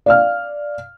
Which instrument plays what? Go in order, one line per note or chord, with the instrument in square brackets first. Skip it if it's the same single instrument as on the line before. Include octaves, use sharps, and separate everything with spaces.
[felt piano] D5 F5 F6